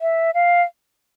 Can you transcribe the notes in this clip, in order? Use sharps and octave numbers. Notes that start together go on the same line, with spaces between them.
E5
F5